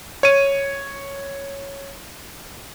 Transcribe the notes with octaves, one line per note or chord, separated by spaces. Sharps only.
C#5 D#7